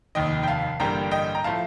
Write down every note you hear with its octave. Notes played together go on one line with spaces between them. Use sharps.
F1 D#2 D#3 D#5 G5
G5
F5 A5
A1 G2 D3 G3 A#3 G5 A#5
D#5 G5
A#5
A2 F3 A3 F5 A5